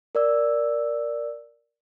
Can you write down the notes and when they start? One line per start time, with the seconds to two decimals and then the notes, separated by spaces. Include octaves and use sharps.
0.15 A#4 D5 E6